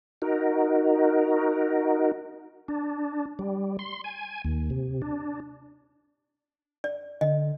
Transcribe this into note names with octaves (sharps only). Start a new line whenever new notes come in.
D#4 F#4 A#4
D4
G3
C6
G#5
D#2
C3
D4
D5
D3 D#5